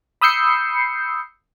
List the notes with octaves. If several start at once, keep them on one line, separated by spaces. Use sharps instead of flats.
B5 D#6 E6 G6 C7 C#7